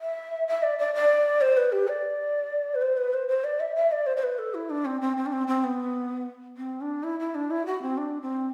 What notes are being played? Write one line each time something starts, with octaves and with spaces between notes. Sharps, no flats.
E5
E5
D5
D5
D5
C5
B4
G4
D5
B4
C5
B4
C5
C5
D5
E5
E5
D5
C5
C5
B4
A4
E4
D4
C4
C4
C4
D4
C4
C4
B3
C4
D4
E4
E4
D4
E4
F#4
C4
D4
C4